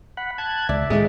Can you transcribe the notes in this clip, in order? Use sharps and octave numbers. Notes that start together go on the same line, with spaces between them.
F#5 B5
A5 F#6 G#6
C#2 D5 E5
A2 D#3 G#3 A3